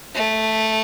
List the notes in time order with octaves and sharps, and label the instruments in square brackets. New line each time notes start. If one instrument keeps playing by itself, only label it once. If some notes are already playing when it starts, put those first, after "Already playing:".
[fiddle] A3